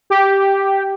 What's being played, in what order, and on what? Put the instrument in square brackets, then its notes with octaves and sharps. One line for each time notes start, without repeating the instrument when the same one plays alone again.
[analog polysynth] G4